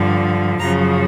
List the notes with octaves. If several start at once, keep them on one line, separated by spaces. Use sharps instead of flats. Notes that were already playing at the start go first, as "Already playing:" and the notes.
Already playing: G2 D3 F3
F#2 C#3 F3 A#5